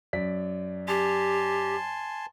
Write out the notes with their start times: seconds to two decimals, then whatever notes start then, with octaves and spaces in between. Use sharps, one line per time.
0.13 F#2 D5 B6
0.88 G4 G#5 A5 C6